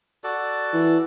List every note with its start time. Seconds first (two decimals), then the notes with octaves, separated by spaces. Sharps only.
0.24 F#4 A4 D5
0.73 E3